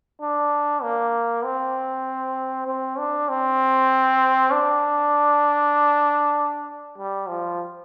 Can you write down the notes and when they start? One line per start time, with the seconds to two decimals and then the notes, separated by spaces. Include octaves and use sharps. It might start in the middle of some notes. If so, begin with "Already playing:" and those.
0.22 D4
0.83 A#3
1.44 C4
2.67 C4
2.98 D4
3.29 C4
4.52 D4
6.98 G3
7.28 F3